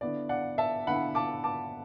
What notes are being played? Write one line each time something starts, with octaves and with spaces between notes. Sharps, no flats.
D3 B3 E4 D5
D5 F#5
E5 A5
D3 B3 E4 F#5 B5
A5 D6
A5 D6